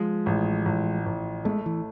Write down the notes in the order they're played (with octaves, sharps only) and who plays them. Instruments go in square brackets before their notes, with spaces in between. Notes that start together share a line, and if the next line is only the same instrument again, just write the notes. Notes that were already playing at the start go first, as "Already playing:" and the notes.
Already playing: [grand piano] F3 [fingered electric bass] G#3
[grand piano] A1
A1
A1
[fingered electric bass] G#3 [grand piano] A3
[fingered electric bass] E3